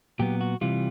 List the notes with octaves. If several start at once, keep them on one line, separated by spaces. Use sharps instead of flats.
A#2 F#3 B3 G4
F#4
C3 E3 G3 F4